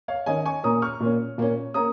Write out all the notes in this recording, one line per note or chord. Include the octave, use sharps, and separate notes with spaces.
C#5 F5
D#3 C#4 D#5 G#5
G#5 C#6
A#2 A#3 C#4 A#5 D#6
C#6 F6
A#2 A#3 C#4
A#2 A#3 C#4
A#3 C#4 A#5 D#6